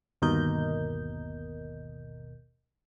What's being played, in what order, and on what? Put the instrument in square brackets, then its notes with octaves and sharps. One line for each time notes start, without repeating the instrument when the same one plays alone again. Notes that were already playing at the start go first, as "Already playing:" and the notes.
[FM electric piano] G1 D#2 B2 A#4 D#5 G6